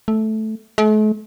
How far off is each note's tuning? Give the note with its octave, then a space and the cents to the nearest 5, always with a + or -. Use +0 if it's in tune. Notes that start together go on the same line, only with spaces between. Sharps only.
A3 -10
A3 -45